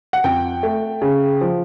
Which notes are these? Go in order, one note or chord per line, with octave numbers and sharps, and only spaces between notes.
F#5
F2 G5
A3
C#3
F3